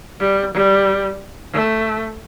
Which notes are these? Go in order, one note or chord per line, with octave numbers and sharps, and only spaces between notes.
G3
G3
A3